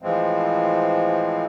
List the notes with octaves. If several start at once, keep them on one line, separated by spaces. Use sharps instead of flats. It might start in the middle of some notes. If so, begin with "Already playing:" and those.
A2 E3 F3 G#3 C4